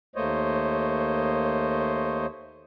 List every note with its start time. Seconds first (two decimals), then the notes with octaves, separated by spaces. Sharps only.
0.16 D#2 A3 A#3 C5 C#5 D#5